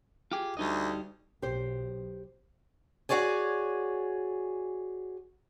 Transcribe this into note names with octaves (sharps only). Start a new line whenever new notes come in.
F4 G4 G#4
D2 G3 D#4 D#5
B1 G4 C5
F#4 G#4 C#5 D5 G#5